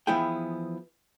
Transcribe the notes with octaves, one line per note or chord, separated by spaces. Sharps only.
E3 F3 B3 E4 G#4 G5